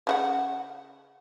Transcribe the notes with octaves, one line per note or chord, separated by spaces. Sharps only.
C#3 F#4 F#5